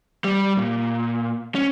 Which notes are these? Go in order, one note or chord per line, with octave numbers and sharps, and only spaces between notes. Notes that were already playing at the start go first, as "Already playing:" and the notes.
G3
A#2
C#4